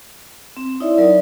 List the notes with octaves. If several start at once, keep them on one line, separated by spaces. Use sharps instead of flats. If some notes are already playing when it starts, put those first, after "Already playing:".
C4
D#4 E4 C#5 D5 E5
F#3 A#4 D5